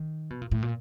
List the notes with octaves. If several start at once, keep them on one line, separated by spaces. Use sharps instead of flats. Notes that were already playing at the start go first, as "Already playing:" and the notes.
Already playing: D#3
B2
A#2
A2
A#2